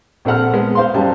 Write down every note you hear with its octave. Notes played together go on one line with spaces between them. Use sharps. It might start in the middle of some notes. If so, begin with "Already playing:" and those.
A#1 C4 A4 F#5 F6
G#3 B3
C5 F5 C6
F#2 G3 A5